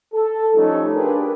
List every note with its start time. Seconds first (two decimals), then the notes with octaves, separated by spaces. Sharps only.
0.13 A4
0.55 F3 G3 A3 C#4 D#4
0.95 D4 F4 G4 G#4 A#4 B4